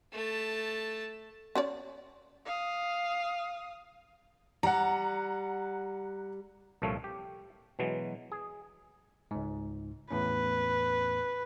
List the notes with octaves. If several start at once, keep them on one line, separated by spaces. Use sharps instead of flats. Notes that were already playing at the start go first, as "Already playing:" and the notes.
A3 A5
C#4 C#5 D5
F5 D#6
G3 F#5 A#5
C2 A#2 F3 A3 A4 C#5
G4
B2 E3 F#3 G#3
G#4
C#2 G#2
E2 A2 C#4 B4